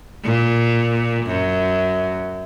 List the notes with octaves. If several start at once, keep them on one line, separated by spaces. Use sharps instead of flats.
A#2
F#2